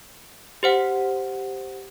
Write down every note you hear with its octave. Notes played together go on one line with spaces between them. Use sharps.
G4 C5 F#5